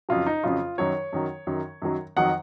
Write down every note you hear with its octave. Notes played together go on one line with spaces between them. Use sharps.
F2 C#3 F#3 F4
D#4
F2 C#3 F#3 F4
F#2 D#3 F#3 C#5
F#2 D#3 F#3
F#2 D#3 F#3
F#2 D#3 F#3
F2 D#3 F#3 F#5